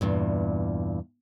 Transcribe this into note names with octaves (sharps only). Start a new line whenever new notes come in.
E2 G2 A#2